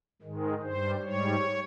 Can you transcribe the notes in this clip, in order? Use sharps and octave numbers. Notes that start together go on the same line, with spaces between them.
G#2 D#3 G#3
G2 G3 C5
G#2 G3 C#5